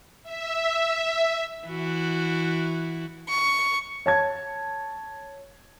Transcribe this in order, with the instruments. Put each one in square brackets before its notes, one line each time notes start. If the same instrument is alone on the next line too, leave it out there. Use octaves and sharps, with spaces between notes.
[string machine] E5
[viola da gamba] E3 E4 F#4
[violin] C#6
[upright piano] C#5 A5 G#6